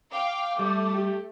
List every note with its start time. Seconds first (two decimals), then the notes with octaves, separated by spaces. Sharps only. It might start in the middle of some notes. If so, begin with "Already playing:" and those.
0.12 F5 G5 D6
0.59 G3 A3
0.94 G4